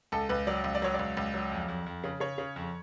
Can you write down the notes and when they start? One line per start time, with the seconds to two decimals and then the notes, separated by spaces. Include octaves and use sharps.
0.12 C#2 A4
0.29 C#2 B4
0.47 F#3 D5
0.64 C#2
0.75 D5
0.82 F#3 C#5
0.94 C#2 D5
1.17 C#2
1.34 F#3
1.52 F2
1.68 F2
1.86 F2
2.04 C#3
2.20 C#3 C#5
2.38 C#3
2.56 F2